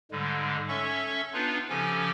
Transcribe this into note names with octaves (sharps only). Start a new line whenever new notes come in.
G#2 D3 G3 G#3
C#4 A4 C#5 E5 C#6
B3 D4 D#4 F4 B4
C#3 F3 C#4 G4 A4 G#5